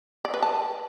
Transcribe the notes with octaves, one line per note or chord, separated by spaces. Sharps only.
D5
B4
A5